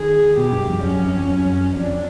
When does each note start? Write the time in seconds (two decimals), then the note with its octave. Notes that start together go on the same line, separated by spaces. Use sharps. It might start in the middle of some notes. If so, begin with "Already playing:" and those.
Already playing: D#3 G#4
0.37 B2 G4
0.52 G2
0.68 F2
0.83 F#2 C#4
0.99 F#2
1.15 F2
1.30 F#2
1.77 F2 D4